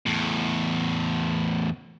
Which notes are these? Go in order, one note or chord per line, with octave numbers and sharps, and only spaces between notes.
E2 A2